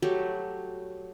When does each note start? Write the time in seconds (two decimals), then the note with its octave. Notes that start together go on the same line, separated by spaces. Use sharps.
0.02 F#3 G3 A3 G4